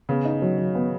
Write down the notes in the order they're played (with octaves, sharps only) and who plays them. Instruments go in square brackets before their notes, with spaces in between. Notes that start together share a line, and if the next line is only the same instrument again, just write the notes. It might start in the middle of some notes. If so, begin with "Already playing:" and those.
[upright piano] C#3 [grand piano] B3
[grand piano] D#4
F#3
F#3
B3